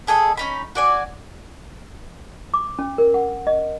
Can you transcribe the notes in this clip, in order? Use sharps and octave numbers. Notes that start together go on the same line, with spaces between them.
B3 G#4 A4 D#5
C#4 D#4 B5
F#4 D5 G#5
D6
C#4
A#4
F#5
D#5